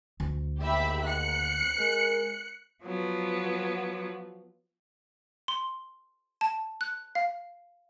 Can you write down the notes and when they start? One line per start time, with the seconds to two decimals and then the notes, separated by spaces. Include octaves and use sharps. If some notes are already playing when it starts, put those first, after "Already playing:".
0.20 D2
0.60 D#2 G#2 G4 E5 B5
1.04 F#6 C#7
1.79 G#3 A#4
2.84 F3 F#3 B3
5.48 C6
6.41 A5
6.81 F#6
7.15 F5